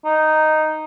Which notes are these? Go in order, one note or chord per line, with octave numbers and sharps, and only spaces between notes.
D#4